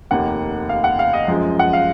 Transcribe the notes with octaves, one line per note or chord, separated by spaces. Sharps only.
F1 D#2 D#3 A#3 F#5
F5
F#5
F5
D#5
F#2 F3 G#3
F#5
F5